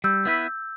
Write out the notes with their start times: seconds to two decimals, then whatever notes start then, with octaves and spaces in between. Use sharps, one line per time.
0.04 G3 E6 G6
0.25 B3 E4 B4